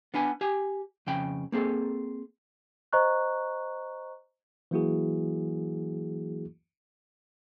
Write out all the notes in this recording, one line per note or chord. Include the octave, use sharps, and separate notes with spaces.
B3 D4 B4 G#5
G4 G#5
F2 C#3 G5 B5
A#3 C4 G#4 A4
C5 D#5 A#5 C#6 F#6
E3 F#3 A#3 E4 F#4 G#4